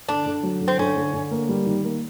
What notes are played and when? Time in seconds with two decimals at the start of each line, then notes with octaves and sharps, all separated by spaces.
0.08 D3 D4
0.26 D3
0.43 F#3
0.61 D3
0.68 C4
0.79 D3 C#4
0.96 D3
1.13 D3
1.31 A#3
1.49 G3
1.66 D#3
1.84 A#3